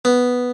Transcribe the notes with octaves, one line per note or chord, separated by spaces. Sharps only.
B3